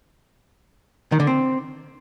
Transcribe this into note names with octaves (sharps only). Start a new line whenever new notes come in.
D#3
D3
C4